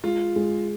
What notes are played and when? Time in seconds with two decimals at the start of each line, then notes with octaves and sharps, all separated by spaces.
0.04 G#3 F4
0.36 G#3